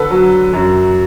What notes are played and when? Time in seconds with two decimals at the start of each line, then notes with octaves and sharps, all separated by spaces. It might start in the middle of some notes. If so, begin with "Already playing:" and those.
Already playing: D3 A4 B4
0.11 F#3
0.53 F#2